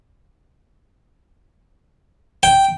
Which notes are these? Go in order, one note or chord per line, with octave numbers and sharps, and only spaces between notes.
G5